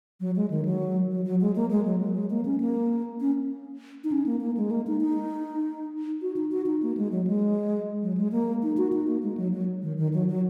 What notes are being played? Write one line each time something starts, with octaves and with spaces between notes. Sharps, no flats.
F#3
G#3
D#3
F#3
F#3
F#3
G#3
A#3
G#3
F#3
F#3
G#3
A#3
C#4
A#3
C#4
D#4
C#4
A#3
A#3
G#3
A#3
D#4
D#4
F#4
D#4
F#4
D#4
A#3
G#3
F#3
G#3
F#3
G#3
A#3
D#4
F#4
D#4
A#3
G#3
F#3
F#3
D#3
D#3
F#3
F#3